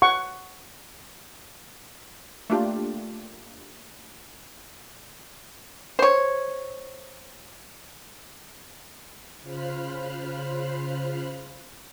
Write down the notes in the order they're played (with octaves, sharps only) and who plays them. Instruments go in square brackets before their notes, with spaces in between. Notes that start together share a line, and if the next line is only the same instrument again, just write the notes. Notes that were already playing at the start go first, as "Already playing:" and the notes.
[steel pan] F#5 C#6
[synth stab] A3 A#3 D4 F4 G4
[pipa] C5 C#5
[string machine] C#3 F4 C5 B5 F6 F#6